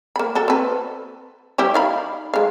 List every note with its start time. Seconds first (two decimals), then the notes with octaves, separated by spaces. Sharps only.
0.16 A#3 B5
0.35 F#4 A4
0.48 C4 B4
1.58 G3 E4 G4
1.74 D#4 F5 B5
2.34 G#3 F5